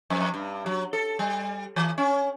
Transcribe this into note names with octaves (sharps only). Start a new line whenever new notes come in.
F2
G2
F#3
A4
G3
E3
C#4